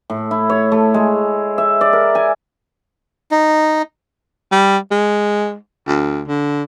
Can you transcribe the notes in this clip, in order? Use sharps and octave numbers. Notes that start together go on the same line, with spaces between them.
A2
E4
C#5
A3
G#3
E5
D5
A#4
G#5
D#4
G3
G#3
D2
D3